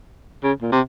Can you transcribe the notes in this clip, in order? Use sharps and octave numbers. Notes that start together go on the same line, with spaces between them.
C#3
A#2
C3